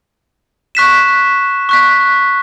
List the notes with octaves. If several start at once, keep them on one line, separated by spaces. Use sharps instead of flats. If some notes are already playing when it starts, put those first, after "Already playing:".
C#6 F#6 B6 E7
C#6 F#6 B6